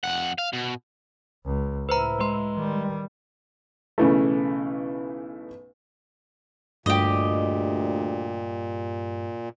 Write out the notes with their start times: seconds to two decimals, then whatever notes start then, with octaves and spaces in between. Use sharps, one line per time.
0.04 F2 F#5
0.38 F5
0.53 B2
1.45 C#2
1.89 A2 E4 B4 C5 A#5
2.20 G#3 B4 A#5 C6
2.55 D#3 G3
3.98 B1 C#3 E3 A3
6.86 D2 G2 A#2 G4 D#5